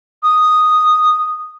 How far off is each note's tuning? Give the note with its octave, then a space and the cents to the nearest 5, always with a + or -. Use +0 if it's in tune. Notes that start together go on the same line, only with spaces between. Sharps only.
D#6 -5